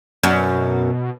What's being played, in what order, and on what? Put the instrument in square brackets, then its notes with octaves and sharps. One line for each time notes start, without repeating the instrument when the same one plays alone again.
[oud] F#2 [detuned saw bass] B2